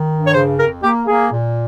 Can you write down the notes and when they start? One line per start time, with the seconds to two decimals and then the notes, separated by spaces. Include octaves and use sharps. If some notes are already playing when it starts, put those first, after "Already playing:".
Already playing: D#3
0.10 G2
0.27 C#5
0.34 C#3 C5
0.59 F2 A#4
0.83 A#3 G4
1.07 A#3 G#4
1.32 A#2